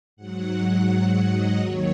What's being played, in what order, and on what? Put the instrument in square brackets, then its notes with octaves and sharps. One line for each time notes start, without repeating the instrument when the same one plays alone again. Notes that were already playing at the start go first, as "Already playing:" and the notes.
[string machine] G#2 F#3 F#5
D#5
D#2 D#3 F#3 C#5